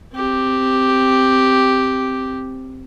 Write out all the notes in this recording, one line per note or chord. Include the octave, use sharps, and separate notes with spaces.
C4 G4